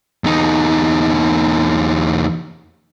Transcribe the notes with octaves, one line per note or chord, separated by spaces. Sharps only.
E2 D#4